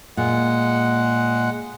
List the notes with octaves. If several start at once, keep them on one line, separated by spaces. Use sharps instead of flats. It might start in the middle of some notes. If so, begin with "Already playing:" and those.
A#2 G#3 F#5